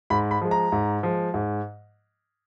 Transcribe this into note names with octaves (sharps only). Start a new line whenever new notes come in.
G#2 B5
B5
F3 G#3
A#5
G#2
F3 G#3
G#2